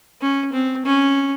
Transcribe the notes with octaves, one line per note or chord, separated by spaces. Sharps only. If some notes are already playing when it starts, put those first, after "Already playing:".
C#4
C4
C#4